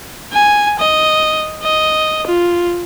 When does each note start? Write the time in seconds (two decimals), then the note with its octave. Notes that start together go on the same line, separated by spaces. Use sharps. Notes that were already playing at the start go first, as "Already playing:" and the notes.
0.33 G#5
0.80 D#5
1.63 D#5
2.27 F4